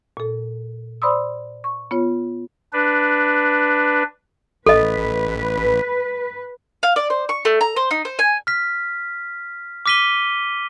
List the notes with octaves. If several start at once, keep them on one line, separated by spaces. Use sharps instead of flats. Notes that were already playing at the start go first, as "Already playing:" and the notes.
A#2 A4
C5 D5 B5 C6 D#6 E6
C#6
B3 F4 C#5
D4 B4
A1 A4 B4 D#5
F5
D5
C5
C#6
A3
A#5
C5
D#4
C5
G#5
F6 B6
D6 F6 B6 D#7 G7